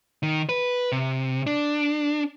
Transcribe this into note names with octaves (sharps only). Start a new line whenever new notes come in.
D#3
B4
C3
D4